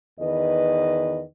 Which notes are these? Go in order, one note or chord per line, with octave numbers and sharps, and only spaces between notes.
E2 D#3 B4 D#5